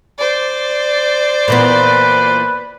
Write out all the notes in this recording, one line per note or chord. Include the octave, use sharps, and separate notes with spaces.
C5 D5
A#2 E3 B3 B4